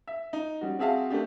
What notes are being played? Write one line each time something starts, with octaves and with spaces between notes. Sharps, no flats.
E5
D#4
G3 C#4 F#4
C4 F#4 G#4 E5 F5 A5
A3 A#3 D4 G4